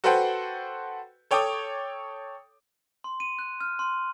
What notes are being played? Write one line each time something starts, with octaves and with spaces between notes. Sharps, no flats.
F#4 A4 B4 C5 F#5 G5
A4 C#5 G5 D6 D#6
C6
D#7
F#6
F6
C6